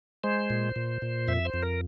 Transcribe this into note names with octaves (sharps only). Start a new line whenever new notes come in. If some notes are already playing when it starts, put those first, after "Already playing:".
G#3 C5
A#2
A#2
A#2
F2 E5
C5
F2
A#4